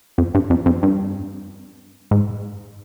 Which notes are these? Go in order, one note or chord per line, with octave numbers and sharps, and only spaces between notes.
F2
G2
F2
F2
G2
G#2